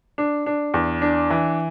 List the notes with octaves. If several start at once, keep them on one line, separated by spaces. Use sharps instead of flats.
D4
D4
E2
D4
E3